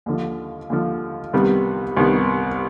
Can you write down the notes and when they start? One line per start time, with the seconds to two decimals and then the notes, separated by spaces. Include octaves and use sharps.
0.06 D#2 D3 F3
0.70 D#2 D3 F3
1.33 C2 C3 D#3 G3 B3
1.96 C2 C3 D#3 G3 B3